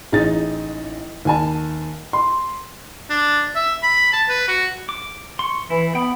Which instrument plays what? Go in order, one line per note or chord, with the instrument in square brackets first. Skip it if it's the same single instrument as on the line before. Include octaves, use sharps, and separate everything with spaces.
[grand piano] A1 D#4 G#4 A6
D#2 G#5 A5
C6
[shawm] D4
E5
B5
A5
B4
F#4
[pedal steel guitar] D6
C6 C#6
[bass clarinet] E3 [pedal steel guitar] E4
[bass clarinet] B3 [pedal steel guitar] G5 B5